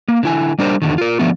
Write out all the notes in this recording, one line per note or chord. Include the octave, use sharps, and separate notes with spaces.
A#3
D3 E4 G#5
G3 D4 A#4 C5
E2 D3 D#3
F4 A#4
D3 F3 A3 B3